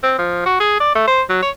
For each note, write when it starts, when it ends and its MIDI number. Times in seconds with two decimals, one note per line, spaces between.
0.03 0.16 60
0.18 0.45 53
0.46 0.59 66
0.60 0.77 68
0.80 0.92 74
0.95 1.07 57
1.07 1.22 72
1.29 1.41 54
1.42 1.50 73